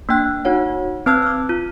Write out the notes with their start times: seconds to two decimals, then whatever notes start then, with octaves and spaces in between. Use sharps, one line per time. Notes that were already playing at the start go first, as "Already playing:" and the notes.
0.09 A#3 D4 G5 F#6
0.45 D#4 F#4 C#5 F#5
1.06 C4 B4 A5 E6 F#6 G#6
1.22 D6 F6
1.49 F4